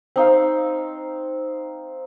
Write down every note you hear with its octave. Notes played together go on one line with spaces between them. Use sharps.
C4 D#4 F5